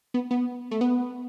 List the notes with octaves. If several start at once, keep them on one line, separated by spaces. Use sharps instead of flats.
B3
B3
A3
B3